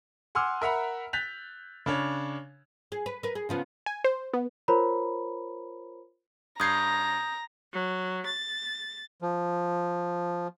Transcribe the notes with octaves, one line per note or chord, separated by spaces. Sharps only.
F#5 G#5 C6 D6 E6 F6
A#4 E5 F#5 A#5 B5
F#6 G6 A6 B6 F7
C#3 D4 C#5
G#4
B4
A#4 B4
G#4
C#3 F3 B3
G#5
C5
B3
F4 A#4 C5 C#5 A#5 B5
G2 A#5 D#6 G6 G#6 C7
F#3
A6
F3